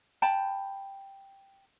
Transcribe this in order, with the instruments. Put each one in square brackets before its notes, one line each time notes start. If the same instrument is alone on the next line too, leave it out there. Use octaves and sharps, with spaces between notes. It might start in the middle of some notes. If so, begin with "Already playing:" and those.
[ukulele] G5 A5 B5